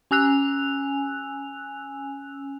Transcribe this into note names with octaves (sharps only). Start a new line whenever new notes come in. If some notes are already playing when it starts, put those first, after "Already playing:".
C#4 G#5 E6 F#6 F7